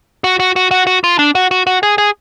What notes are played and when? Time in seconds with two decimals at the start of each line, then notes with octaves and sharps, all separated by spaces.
0.24 F#4
0.40 F#4
0.56 F#4
0.71 F#4
0.87 F#4
1.04 F4
1.19 D4
1.35 F#4
1.51 F#4
1.67 F#4
1.83 G#4
1.98 G#4